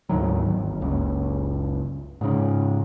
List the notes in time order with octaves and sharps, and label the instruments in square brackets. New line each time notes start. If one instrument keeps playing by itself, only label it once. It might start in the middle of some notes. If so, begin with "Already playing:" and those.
[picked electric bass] D2 G#2 D#3 F#3
G1
F#1 C#2
G#2 C#3